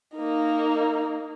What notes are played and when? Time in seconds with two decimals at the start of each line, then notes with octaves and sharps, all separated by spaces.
0.15 A#3 D#4